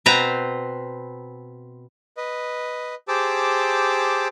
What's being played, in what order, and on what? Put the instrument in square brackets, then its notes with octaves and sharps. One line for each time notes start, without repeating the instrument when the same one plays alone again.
[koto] B2 C4 B4 C5 G5 A#5
[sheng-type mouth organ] B4 D#5
G4 G#4 C5 A5 D6 E6